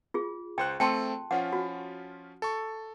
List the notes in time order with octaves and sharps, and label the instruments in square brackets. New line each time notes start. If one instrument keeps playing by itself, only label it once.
[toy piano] F4 G#4
[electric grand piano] C#2 C5 F#6 [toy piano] G5
[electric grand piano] A3 C4 A4 [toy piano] G5 A5 C6
[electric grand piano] F3 C#4 F4 [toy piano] F#5
[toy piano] F#4
[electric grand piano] A4 C#6